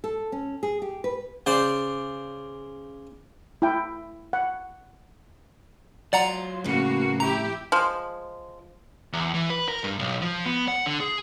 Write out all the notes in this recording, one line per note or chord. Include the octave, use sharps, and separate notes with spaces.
A4
C#4
G#4
G4
B4
C#3 C5 D5
E4 G5
F#5
F#3 F4 D5 F#5 A#5
F2 A2 C#3 A#3 F#4 B4
E4 G4 A#5
F3 G#3
E2
E3
B4
A#4
G2
B1
F3
B3
F#5
D3
G#4